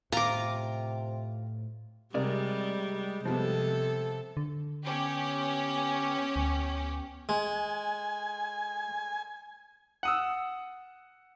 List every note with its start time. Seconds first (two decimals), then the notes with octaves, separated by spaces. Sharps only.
0.12 A2 C3 F4 A#5 D6
2.14 C3 G3 G#3 A#4 D5
3.25 C3 F3 G3 B3 A4
4.37 D3
4.84 B3 C#4 G4
6.36 D2
7.29 G#3 G#5
10.03 F#5 D#6 E6